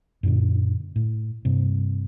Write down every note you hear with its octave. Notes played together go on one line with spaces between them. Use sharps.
F#2 A#2 D3
A2
G2 C3